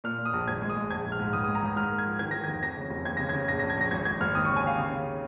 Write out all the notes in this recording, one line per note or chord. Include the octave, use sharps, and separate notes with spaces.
A#2 F6
A#2
D#6
A#1
G#1 G#6
G#3
D#6
G#3
A#1 G#6
A#1
F6
G#2
C#2 D#6
D#6
G#3
A#5
C#2 D#6
G#2 F6
A#3
G#6
F3
D#3 G#6
D#3 A#6
G#6
F1
F2 A#6
C#3
F1
D#2 G#6
C#3 A#6
G#6
C#3
A#1 A#6
A#6
A#1
G#6
A#1 A#6
G#1 G#6
G#1 G#6
G#1 F6
D#2 D#6
C#6
C#3
G#5
D#2 F5
C#3
C#3